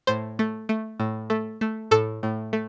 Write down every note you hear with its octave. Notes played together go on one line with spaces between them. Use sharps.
A2 C5
A3
A3
A2
A3
A3
A2 A4
A2
A3